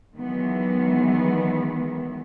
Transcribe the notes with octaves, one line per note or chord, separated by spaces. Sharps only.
D#3 E3 F#3 G#3 B3